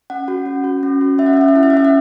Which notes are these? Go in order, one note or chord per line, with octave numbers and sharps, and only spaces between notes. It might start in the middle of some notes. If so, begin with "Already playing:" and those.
C#4 F#5
F#4
C#4
F#4
C#4
F#4
C#4 E5
F#5
E5
C#4 F#5
E5
E4 F#5
E5
F#5
C#4 E5
F#5